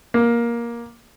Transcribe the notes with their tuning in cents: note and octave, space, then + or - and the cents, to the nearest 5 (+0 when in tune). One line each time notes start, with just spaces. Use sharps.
A#3 +15